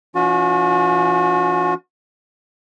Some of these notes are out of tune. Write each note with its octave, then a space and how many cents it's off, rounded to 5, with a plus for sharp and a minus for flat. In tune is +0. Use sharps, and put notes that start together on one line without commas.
E3 +40 C#4 +45 F#4 -35